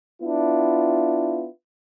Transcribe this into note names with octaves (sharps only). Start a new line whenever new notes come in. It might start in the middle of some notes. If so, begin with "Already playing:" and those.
B3 D4 E4 F4